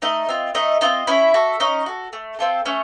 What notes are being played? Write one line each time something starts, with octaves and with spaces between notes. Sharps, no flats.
A3 D#4 D#5
C4 F4
A3 D#4 D#5
C4 D#4 F4 D#5
C#4 E4 E5
F#4 A4
C#4 D#4 D#5
F#4 A4
A3
C4 F4 A4
A3 C#4 C#5